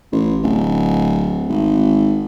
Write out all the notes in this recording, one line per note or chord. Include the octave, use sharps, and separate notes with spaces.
A1
D1
G#1